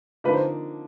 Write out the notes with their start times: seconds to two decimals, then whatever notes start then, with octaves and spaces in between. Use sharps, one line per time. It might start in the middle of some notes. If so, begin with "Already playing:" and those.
0.24 D3 F3 A#3 D#4 B4
0.34 C5